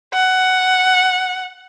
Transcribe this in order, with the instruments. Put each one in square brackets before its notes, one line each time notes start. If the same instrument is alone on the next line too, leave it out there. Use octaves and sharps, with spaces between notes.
[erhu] F#5